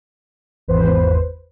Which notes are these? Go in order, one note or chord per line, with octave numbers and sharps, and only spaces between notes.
G#1 E2 B4 C5